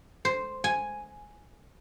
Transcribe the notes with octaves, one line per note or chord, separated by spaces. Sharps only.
C5
G#5